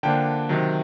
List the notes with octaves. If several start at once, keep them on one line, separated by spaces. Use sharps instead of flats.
D3 F3 A#3 D4 G5 A5
C3 D#3 F#3